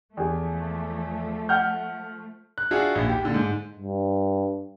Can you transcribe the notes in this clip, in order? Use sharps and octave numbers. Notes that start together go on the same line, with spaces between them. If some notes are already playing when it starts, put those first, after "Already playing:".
E2 F3 A3 G#4
F#5 F6 G6
F#6
D4 F4 F#4 G#4 E5
A#1 D#2
G4
A#2 D3
G#2
G2